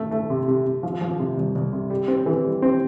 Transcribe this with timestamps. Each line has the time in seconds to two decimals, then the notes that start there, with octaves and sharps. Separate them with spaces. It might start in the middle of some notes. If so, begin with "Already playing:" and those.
Already playing: A3
0.11 A3
0.30 C3
0.48 C3
0.65 C3
0.83 F3
1.01 F3
1.19 C3
1.37 C2
1.55 C2
1.72 C3
1.90 G3
2.08 C4
2.26 E3
2.44 G3
2.62 C4